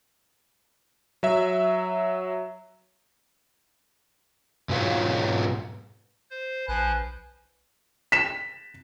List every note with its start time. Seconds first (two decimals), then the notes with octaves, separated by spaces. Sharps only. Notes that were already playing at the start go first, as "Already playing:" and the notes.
1.23 F#3 E5
4.69 G#2 B2 F#3 F4 B4 C#5
6.30 C5
6.68 A#1 F3 B4 C5 G#5 F#6
8.12 B6 E7